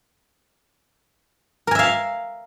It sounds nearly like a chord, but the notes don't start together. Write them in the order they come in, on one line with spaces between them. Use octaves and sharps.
A#4 G#5 E5 F5